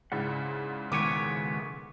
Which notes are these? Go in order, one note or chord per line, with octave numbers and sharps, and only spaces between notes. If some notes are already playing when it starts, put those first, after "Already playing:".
G#2 C#3 E4 D5 F#5
B1 D#3 G#3 B3 E4 C#5 D6